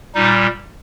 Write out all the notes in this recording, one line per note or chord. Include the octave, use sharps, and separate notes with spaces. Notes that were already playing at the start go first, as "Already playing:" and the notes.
A#2 G3 D#4